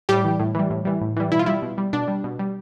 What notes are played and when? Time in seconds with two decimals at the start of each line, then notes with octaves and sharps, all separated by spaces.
0.09 A2 G3 G4
0.25 E3 G3
0.39 A2
0.55 E3 G3
0.70 A2
0.85 E3 G3
1.01 A2
1.16 E3 G3
1.32 B2 E4
1.39 F4
1.46 G3 E4
1.62 B2
1.78 G3
1.93 B2 D4
2.08 G3
2.24 B2
2.39 G3